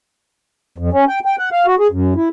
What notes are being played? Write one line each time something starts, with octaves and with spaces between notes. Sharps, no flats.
F2
C#4
G5
G5
F#5
F5
F#4
G#4
F#2
E4